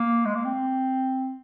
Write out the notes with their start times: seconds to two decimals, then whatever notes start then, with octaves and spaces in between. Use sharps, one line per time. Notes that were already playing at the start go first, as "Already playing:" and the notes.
Already playing: A#3
0.26 G#3
0.35 A#3
0.45 C4